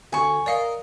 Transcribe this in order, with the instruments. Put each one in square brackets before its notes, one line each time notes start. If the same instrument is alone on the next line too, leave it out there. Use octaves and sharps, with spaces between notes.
[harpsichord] D2 [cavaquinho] G#5 C#6
[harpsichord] A#4 D#5 [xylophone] D5 F5 C#7